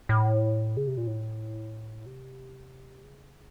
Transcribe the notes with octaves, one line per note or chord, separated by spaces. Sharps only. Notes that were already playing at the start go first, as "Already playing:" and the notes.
A2
C#3
C3
A#2
A2
C3
C#3